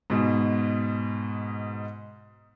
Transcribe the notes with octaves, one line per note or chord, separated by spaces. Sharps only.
G#2 B2